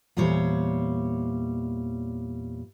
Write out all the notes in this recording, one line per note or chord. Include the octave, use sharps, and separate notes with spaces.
E2 A#2 G3 C5 C#5